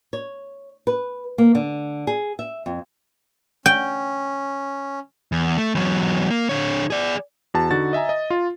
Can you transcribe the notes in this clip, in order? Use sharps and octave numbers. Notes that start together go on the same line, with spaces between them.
C#5
B4
A#3
D3
G#4
E5
F2
C#4 G5
E2
A3
E2 F#3
A#3
D3 C#5
G#4 D5
E2 F#4 A5
D3 D#4 F#4 A6
D#5 E5 G#5 A#5
D#5
F4